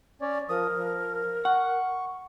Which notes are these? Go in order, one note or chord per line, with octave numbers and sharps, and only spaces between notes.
C#4 C#5 D5
F3 A#4 D#6
F3
F#5 C#6